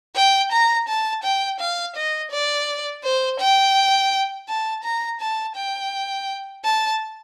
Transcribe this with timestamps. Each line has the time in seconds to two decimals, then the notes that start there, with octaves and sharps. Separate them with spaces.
0.16 G5
0.52 A#5
0.88 A5
1.23 G5
1.60 F5
1.96 D#5
2.31 D5
3.03 C5
3.39 G5
4.48 A5
4.83 A#5
5.20 A5
5.56 G5
6.64 A5